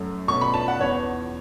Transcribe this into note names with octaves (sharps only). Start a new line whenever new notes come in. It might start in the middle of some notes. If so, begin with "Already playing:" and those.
Already playing: F#2 F#3 A3 C#4
B2 A3 C#4 C#6
B5
A5
F#5
E2 E3 B3 C#5